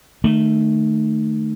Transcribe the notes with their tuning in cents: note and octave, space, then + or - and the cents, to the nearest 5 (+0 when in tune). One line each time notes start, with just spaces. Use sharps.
D#3 -30 A3 +0